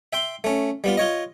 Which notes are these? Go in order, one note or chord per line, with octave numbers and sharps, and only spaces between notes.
E5 G5 C6
A3 C#4
G3 B3 F4
F4 C#5 D#5